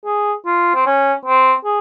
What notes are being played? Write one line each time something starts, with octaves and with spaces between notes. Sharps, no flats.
G#4
F4
C4
C#4
C4
G#4